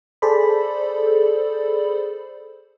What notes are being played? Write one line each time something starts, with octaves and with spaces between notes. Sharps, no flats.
G#4 A4 C5 D5 B5